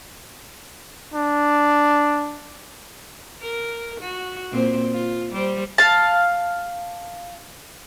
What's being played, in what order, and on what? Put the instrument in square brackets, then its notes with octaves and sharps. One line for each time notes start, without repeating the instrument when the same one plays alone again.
[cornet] D4
[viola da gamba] A#4
F#4
A#2 C4 C5
F4
G3 C5
[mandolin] F5 A5